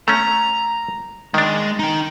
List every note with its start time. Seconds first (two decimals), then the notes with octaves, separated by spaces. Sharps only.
0.08 A3 C#4 A#5
1.34 D#3 G#3 D4
1.79 D#4 G5